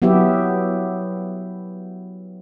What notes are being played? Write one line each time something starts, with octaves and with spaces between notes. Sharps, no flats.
F#3 B3 E4 G4 E5